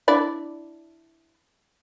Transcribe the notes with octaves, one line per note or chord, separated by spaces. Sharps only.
D4 E4 D5